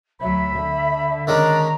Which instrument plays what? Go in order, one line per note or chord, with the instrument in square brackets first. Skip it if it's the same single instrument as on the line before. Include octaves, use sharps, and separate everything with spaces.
[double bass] D2 F#3 [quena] E5 [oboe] B5
[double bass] D3
[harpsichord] D#3 G#3 C#4 [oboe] D4 [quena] A#5